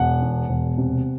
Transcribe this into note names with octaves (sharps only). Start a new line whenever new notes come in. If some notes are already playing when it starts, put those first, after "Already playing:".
Already playing: E1 F#5
E2
E1
C3